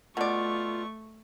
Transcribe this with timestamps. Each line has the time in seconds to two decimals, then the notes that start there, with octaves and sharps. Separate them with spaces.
0.17 B2 A3 F4 D5 C#6